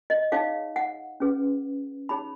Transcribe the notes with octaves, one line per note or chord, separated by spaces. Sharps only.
D#5
D#4 G#4 C#5 F5
F#5
C#4 G#4 B4
D#4 G#4 C#5 B5